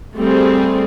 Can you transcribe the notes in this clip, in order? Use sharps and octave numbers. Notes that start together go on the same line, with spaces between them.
G3 A3 C4 G#4